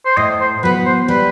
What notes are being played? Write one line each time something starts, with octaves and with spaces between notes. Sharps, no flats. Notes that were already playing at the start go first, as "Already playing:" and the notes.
C5
A2 D#5
C5
F#3 B3 B4
C5
G3 B4